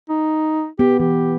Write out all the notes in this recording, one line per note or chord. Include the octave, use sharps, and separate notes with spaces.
D#4
B3 G4
E3 G4